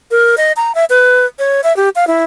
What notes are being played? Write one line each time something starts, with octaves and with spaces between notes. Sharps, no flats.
A#4
D#5
A#5
E5
B4
C#5
E5
G4
F5
E4